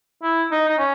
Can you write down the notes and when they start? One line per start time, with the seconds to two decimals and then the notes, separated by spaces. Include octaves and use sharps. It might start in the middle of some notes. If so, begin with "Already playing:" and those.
0.23 E4
0.51 D#4
0.68 D#4
0.78 C#4